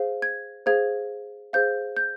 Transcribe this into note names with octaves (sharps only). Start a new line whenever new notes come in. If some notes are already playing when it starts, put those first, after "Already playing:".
Already playing: G#4 C5 F5
G#6
G#4 C5 F5 G#6
G#4 C5 F5 G6
G6